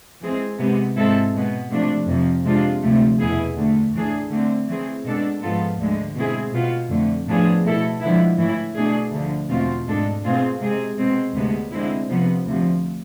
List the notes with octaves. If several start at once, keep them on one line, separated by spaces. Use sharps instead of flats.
E3 G#3 C4 G#4
C3 G#3 B3
G#2 G#3 C4 E4 A4
B2 G#3 B3
C3 F3 A3 D4
F2 C3 F3
C3 G#3 D4 F4
D2 C3 F3 A3
E2 B2 B3 E4 G#4
D2 D3 A3
A2 E3 A3 D4 G#4
D3 A3 C4
E3 A3 C4 G#4
B2 G#3 D4 A4
G#2 F3 B3 F4 A4
D2 D3 G#3
B2 G#3 C4 E4 G#4
B2 B3 F4
F2 D3 A3
A2 F3 B3 D4 G#4
B2 A3 E4 A4
D3 F3 G#3 B3 E4
A2 E3 A3 E4
B2 A3 D4 G#4
D2 D3 F3
E2 B2 A3 C4 F4
G#2 G#3 D4 A4
B2 A3 C4 F4 G#4
C3 G#3 C4 G#4
B2 G#3 C4
D2 C3 G#3 B3
D3 G#3 C4 E4
C3 F3 B3
D2 C3 F3